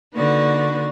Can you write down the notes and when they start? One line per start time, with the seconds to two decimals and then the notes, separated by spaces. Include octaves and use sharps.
0.15 D3 A#3 D#4 F#4 B4 D5